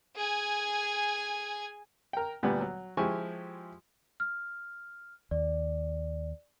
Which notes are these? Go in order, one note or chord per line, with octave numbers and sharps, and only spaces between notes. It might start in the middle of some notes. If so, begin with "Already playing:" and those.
G#4 G#5
A#4 G5
D2 A#2 G3 B3 G#5
F#3
F3 G#3 E4 G4 G#5 C#6
F6
D#2 D5